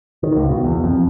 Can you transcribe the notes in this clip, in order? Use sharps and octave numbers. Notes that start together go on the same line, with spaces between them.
D#3
C#2
B2
E2
F2